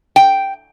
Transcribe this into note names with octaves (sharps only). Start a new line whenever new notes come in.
G5